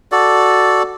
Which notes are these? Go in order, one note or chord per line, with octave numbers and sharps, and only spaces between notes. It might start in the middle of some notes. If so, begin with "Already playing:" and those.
F#4 A4 D5